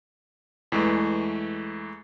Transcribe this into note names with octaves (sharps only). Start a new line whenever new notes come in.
E2 E3 G#3 A3